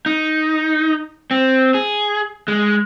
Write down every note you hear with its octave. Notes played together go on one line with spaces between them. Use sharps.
D#4
C4
G#4
G#3